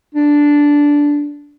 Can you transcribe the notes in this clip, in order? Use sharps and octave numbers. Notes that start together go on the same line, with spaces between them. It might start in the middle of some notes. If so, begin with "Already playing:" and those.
D4